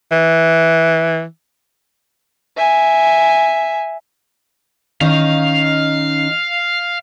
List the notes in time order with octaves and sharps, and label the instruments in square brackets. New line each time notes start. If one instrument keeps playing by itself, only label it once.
[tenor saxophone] E3
[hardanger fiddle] E5 G#5
[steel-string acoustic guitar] D#3 C#4 D#4 [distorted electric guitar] F5